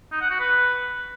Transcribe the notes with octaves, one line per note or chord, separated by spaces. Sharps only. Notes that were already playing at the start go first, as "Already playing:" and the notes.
D#4
F#5
F#4
B4